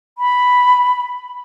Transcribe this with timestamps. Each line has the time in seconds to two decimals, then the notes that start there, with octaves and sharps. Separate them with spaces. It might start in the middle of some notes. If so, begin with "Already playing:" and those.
0.18 B5